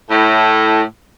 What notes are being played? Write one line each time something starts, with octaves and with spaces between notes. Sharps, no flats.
A2